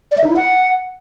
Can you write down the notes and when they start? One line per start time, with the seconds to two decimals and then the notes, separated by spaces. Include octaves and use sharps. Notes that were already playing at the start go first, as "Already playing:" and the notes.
0.11 D5
0.18 E5
0.24 D#4
0.30 E4
0.36 F#5